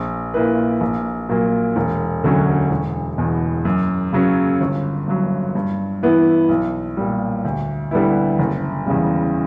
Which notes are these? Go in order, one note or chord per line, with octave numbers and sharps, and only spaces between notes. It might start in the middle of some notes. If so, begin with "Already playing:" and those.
Already playing: A#1
A#2 A#3 E4 B4
A#1
A#2 F#3 A#3
E1
D2 D3 F#3 C#4
E1
E2 B2
F#2
C#3 F#3 C#4
G1
G2 F#3
G2
E3 B3 E4
B1
A#2 G3
D2
D3 G3 B3 E4
F#1
E2 C#3 G3